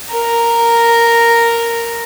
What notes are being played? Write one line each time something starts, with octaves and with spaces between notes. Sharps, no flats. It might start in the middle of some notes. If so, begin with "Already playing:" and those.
A#4 A#5